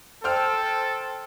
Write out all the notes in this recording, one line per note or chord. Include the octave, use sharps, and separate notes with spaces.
A4 C5 G5 F6